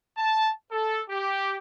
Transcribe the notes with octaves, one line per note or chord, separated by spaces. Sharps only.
A5
A4
G4